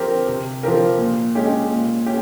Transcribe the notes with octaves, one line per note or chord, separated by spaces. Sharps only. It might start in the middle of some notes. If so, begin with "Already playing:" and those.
Already playing: F3 C4 G4 A#4
C3
F3 C4 G4 A#4
A#2
G#3 C#4 G4
A#2
C#4 G4